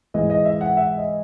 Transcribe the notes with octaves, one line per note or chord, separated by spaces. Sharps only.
G#2 E3 G#3 D#5
D#5
E5
F#5
E5
D#5